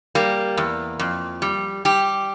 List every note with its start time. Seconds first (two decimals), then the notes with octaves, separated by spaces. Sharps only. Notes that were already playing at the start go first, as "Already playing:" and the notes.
0.15 G3 A#3
0.57 E2
0.99 F2
1.42 G3
1.85 G3 G4